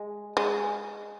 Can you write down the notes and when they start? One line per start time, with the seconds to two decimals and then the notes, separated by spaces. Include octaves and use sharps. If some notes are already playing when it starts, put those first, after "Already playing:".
Already playing: G#3
0.37 G#3